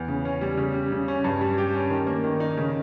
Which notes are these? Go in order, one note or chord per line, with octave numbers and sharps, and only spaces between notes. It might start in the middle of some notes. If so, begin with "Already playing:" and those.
Already playing: E2
C#3
C#4
G3
C#3
G3
C#3
C#4
G2
G3
G4
C#4
D#3
A#3
D#3
D#4
C#3